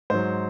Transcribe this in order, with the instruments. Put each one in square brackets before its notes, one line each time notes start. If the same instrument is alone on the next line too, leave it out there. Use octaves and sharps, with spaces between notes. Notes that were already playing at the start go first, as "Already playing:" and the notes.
[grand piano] G#2 F#3 C5